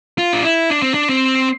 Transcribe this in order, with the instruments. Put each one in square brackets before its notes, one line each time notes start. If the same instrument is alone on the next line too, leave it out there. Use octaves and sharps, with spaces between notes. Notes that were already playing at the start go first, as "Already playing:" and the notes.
[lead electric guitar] F4
D4
E4
D4
C4
D4
C4